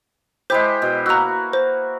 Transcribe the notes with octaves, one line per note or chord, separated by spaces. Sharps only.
G#3 E4 G4 C5
B2
A#3 F#4 A#5 E6
C5